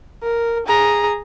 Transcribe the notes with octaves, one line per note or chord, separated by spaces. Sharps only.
A#4
G#4 A#5